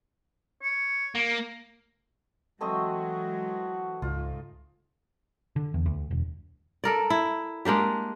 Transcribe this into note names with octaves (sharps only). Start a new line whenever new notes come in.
C#5
A#3
E3 F#3 G#3 A3 C4 F#4 D#5
C#2 G#2 F4
D3
E2
D2
E1
A4 A#4 D5
E4
G#3 A#3 D4 G4